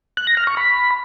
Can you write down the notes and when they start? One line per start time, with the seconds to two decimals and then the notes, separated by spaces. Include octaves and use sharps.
0.17 F#6
0.27 A#6
0.37 F6
0.47 C#6
0.57 B5